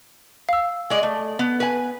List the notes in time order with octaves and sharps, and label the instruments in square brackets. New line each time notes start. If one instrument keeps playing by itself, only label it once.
[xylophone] F5 E6
[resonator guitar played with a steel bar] G#3 D5 D#5
A3
B3
B4 G#5